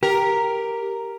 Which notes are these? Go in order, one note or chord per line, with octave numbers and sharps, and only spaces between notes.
G4 A#4